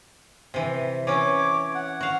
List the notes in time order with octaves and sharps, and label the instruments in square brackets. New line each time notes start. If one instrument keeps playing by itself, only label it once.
[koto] C3 E3
[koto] E3 C#4 [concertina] C#5 D6
[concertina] F#5
[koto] F#4 F5